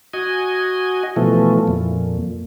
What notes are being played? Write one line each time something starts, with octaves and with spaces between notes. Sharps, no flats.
F#4 D#5 G#5
B2 E3 F3 A3
F2 A#2